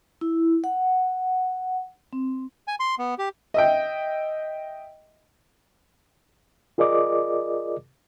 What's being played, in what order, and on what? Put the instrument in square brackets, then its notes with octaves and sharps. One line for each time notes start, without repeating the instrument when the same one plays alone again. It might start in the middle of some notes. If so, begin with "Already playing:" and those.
[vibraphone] E4
F#5
C4
[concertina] G#5
C6
B3
G4
[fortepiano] D#5 E5 G5
[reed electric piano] F4 G#4 A#4 D5 D#5 D6